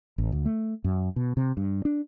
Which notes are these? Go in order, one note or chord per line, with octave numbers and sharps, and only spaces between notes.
A1
D2
A3
F#2
B2
C3
G2
D4